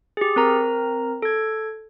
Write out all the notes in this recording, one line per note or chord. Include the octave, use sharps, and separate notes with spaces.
G4 G#4
C4 A#4 A#5
A4 G#6